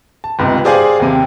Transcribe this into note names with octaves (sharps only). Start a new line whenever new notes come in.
A5
G1 C#2 G#2 C3
G4 G#4 C5 D5 F5 G#5
D#2 C3